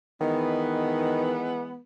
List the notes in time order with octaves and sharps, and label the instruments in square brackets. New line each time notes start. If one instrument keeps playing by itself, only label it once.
[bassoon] D#3 [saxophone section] E3 G#3 B3